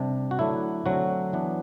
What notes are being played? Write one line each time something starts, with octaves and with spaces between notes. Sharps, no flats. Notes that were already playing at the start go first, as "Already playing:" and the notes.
Already playing: C3 G3 D4
F#4
D3 F#3 A3 D4 E4
D3 F#3 A3 C4 F#4
E3 B3 D4